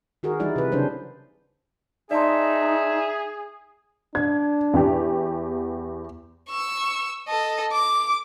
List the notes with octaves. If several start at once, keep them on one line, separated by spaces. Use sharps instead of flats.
D#3 F#4 G#4 A#4
E3 G3 D#4 E4 D5
C3 B4
C#3 F#3 C#4 D4 C5
D#4 G#4 D5 E5 A5 C6
D4 G#6
E2 G4
B3
C#6 E6
A4 D#5
D6